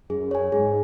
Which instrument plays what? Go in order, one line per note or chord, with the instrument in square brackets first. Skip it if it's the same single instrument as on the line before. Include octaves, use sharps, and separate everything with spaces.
[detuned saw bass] F#2 [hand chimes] G#4
[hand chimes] C#5 G#5
[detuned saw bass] G#2 [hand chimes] G#4